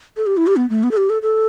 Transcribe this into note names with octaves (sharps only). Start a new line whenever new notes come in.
A4
G4
E4
G4
B3
A3
B3
A4
G4
A4
A4